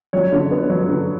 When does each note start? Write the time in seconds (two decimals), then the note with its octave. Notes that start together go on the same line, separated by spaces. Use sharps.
0.13 F#3 C#5
0.32 D3
0.51 B3
0.70 F#3
0.89 D3